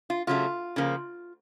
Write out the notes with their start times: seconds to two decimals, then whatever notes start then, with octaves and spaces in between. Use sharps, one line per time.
0.10 F4
0.27 C#3 F#3 A3 F4
0.76 C#3 F3 A#3